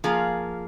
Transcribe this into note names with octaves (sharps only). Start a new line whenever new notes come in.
F3 A#3 F4 G#4